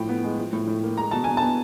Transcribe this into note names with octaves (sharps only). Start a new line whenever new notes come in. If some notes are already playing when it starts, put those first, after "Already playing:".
Already playing: A2 F3 G5
B3
G#3
F3
A2
A2
A#3
G#3 A#5
B2 A5
B2 G#5
B3 A5